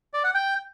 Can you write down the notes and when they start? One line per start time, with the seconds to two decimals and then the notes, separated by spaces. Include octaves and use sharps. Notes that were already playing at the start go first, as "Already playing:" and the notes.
0.14 D5
0.24 F#5
0.34 G5